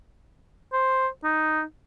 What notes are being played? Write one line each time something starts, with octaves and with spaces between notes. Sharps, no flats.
C5
D#4